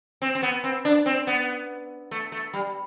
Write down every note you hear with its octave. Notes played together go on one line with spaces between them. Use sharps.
C4
C4
B3
C4
D4
C4
B3
A3
A3
G3